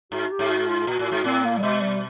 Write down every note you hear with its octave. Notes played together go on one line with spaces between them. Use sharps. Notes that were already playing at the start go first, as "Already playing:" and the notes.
G#2 F#4
G4
G#2
F#4
F4
A#2 F#4
A2
F#4
G#2
A2 C4
A#3
G3
B2 G#3
G3